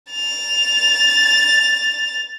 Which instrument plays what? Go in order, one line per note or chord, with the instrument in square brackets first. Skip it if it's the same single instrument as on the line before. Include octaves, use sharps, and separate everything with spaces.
[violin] A6 F7